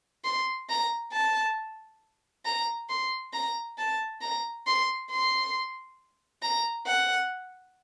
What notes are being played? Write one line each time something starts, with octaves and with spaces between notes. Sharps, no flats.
C6
A#5
A5
A#5
C6
A#5
A5
A#5
C6
C6
A#5
F#5